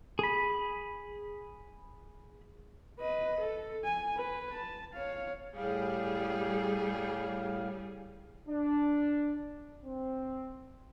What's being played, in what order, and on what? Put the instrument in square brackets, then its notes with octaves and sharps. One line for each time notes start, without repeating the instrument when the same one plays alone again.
[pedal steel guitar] G#4 B5
[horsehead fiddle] B4 D#5
A4
G#5
B4
A5
C#5 F5
[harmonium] A2 F5 [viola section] G3 G#4
[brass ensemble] D4
C4